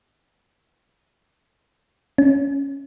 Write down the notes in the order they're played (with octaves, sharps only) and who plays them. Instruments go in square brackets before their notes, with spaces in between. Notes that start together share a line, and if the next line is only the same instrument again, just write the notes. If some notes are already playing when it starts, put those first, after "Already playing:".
[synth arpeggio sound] C#4